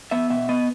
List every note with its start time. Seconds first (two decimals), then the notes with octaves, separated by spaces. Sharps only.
0.11 B3 E5
0.30 B2 E5
0.49 B3 D#5